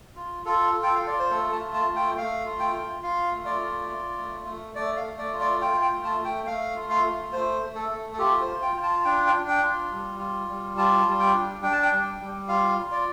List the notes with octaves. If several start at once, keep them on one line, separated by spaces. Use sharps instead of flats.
F4
F4 A4
F4
G5
F5
F4 D5
C5
A3 A4
A5
F4
A5
A3
G5
A3 F5
F4
G5
F4
F4 F5
A3
D5
F4
F4
A3
A3
A3 D5
F5
A3
D5
F4
D5
F4 G5
G5
A3
A5
A3
G5
A3 F5
F4
F5
A3
A3 C5
A3
A4
A3
A4
F4 G4
C5
F4
G5
F4
A5
D4 G5
G5
D4
G5
F4
G3
F4
G3
F4 A5
G3
G5
D4
D4 G5
A5
G5
G3
G3
F4 F5
F4
D5